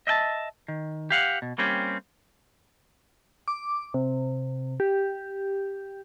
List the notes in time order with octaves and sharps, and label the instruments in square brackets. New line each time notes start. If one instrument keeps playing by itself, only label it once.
[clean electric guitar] D#5 E5 G5 A5
D#3
G4 F5 F#5
B2
G3 A#3 C4 C#4 G4
[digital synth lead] D6
C3
G4